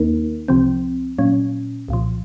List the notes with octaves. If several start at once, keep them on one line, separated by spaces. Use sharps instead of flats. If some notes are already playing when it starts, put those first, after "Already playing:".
Already playing: D#2 D#3 A#3 D#4 A#4
C2 C3 F3 C4
A#2 F#3 C#4
C2 A#2 F3